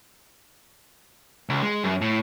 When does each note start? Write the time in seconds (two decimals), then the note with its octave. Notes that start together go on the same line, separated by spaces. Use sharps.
1.49 C#2
1.62 G#3
1.84 F#2
2.01 A2